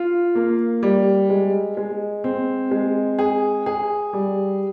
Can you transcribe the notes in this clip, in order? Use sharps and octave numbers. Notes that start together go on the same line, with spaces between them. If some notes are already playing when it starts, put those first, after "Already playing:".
Already playing: F4
A#3
G3
G#3
G#3
C4
G#3
G#4
G#4
G3